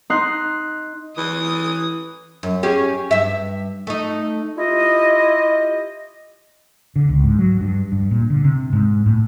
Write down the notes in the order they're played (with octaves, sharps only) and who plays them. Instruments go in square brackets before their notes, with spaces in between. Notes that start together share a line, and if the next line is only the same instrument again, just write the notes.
[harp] D#4 C6 F#6
[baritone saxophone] E3 [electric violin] D#6
[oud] F#2
C#4 G4 G#4
G2 E5
A3 D#4
[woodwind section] E4 F4 G4 D#5
[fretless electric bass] D3
C#2
G#2
F#3
G2
G2
A#2
D3
C3
G#2
A2